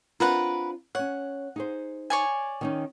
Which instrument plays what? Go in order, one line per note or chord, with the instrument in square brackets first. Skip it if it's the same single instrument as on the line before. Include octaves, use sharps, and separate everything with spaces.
[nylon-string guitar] C4 D4 F4 [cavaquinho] A#4 B4 F#5
[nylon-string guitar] C#4 C#5 [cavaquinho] F#5
[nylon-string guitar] D#4 G#4 C5
[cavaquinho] C#5 D5 G#5
[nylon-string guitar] D#3 C#4 D#4